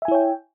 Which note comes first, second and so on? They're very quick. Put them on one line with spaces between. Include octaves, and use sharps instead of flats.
E5 G#5 E4 C#5 G5